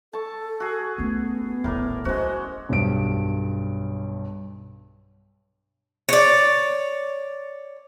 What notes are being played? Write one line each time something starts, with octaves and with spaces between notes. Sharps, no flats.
A4 A5 C#6
F#4 G#4
A3 B3 C#4
D#1 A1 A2 A#4 D5
F#3 G#3 C#4 F#4 C5
B1 G2 D7
C#5 D5